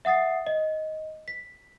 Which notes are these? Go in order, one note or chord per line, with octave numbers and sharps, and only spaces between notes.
E5 F#5 D#6 A6 C7
D#5
B6